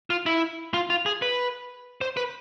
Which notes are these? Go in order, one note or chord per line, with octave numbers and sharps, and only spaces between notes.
F4
E4
F4
F4
G#4
B4
C5
B4